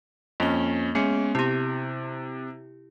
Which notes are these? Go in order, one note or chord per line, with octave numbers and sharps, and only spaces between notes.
F2 A#3 C#4 G7
G#3 B3 C#4 C#7
C3 E4 G4